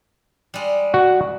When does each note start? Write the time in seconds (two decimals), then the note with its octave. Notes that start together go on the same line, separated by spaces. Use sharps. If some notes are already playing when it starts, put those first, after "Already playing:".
0.54 G3 G#3
0.94 F#4